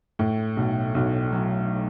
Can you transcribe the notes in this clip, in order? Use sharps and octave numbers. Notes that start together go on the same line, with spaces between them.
A2
B1
B1
F#3